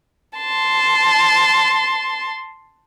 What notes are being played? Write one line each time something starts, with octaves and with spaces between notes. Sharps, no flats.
A5 C6